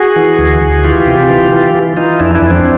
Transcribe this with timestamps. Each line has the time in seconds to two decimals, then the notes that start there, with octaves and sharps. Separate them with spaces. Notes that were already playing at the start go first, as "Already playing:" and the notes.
Already playing: F#4 G#4
0.16 E3
0.39 D2
0.62 D2
0.84 E3 F4 G4
1.07 C3
1.29 E3
1.52 E3
1.74 E3
1.97 E3 D#4 F4
2.19 F2 D4 E4
2.35 D4 E4
2.42 F2
2.50 C4 D4